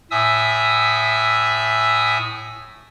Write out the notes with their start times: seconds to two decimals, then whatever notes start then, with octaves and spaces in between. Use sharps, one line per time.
0.11 A2 E5 G#5 D#6 E6